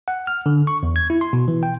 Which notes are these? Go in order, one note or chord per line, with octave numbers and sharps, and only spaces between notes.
F#5
F6
D3
C#6
E2
G#6
E4
C6
B2
E3
G5